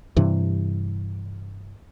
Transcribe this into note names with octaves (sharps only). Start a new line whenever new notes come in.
G2 C3 E3